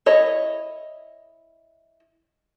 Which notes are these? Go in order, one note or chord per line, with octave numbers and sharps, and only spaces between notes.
E4 C#5 D#5